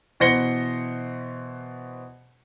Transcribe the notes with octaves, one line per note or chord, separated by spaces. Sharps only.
B2 E3 C5 A#6 C#7 G7